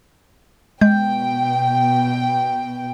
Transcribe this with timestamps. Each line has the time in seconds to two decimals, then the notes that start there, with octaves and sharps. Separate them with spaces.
0.81 B2 G#3 G5 G6